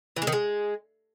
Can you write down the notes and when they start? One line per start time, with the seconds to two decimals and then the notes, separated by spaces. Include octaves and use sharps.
0.16 E3
0.22 G#3
0.27 D#3
0.32 G#3